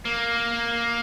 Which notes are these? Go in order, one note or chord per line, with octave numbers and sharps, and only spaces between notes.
A#3